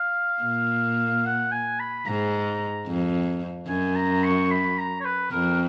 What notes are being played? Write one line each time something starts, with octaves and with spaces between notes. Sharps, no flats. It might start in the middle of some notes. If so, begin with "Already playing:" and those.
Already playing: F5
A#2
F#5
G#5
B5
G#2 A#5
F2
F#2 G#5
A#5
C#6
B5
A#5
C#5
B4
F2 A#4